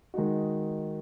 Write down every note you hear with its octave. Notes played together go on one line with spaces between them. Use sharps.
D#3 G#3 D#4 F#4